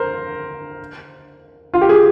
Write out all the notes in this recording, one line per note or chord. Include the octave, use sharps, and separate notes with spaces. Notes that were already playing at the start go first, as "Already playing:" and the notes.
Already playing: A#4 C5
F4
G4
G#4